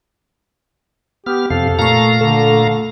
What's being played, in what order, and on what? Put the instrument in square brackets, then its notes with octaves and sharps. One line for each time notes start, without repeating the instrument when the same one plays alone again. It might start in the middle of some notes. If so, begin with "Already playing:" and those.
[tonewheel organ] B3 F6 [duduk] G4
[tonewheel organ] F2 C3 F5 [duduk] A4
[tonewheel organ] A#2 F5 A#5 [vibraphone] A3 C#6
[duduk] D3 [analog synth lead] A4